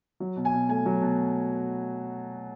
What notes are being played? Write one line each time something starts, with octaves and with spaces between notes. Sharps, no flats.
F#3
B2
G#5
B2
A3 G#5
F#3
B2